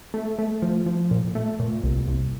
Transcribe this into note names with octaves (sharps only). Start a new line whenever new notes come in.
A3
A3
F3
F3
A#2
A3
A#2
C2
C2